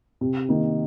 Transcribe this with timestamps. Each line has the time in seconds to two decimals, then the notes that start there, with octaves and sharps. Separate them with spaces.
0.21 C3
0.49 D#3 A#3 D#4